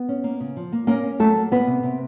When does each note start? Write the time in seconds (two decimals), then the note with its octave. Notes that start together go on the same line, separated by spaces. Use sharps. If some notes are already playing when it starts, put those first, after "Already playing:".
Already playing: B3 B4
0.09 C#4
0.24 A#3
0.40 C#3
0.57 F3
0.73 A#3
0.87 A#3 C#4 A#4
1.03 C#4
1.19 F#3 A3 A4
1.36 A#3
1.52 A#3 B3 B4
1.67 C3
1.83 C3